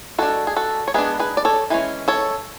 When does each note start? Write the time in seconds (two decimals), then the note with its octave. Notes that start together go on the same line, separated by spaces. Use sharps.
0.18 G#3 D4 F#4 A4
0.47 G#4
0.56 F#4 A4
0.88 C#5
0.94 G#3 B3 D4 G#4 B4
1.19 G#4 B4
1.37 D5
1.45 A4 C#5
1.70 E3 G#3 C#4
2.08 A4 C#5